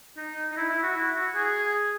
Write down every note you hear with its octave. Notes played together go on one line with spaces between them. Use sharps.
D#4
D#4
E4
E4
F#4
E4
F#4
G#4